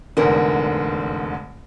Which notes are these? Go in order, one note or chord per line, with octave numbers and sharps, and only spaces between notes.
F1 E2 G#2 D3 A#4